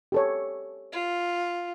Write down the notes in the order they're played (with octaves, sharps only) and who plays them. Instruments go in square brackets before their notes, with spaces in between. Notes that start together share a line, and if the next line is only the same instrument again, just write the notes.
[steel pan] G4 A4 C#5
[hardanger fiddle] F4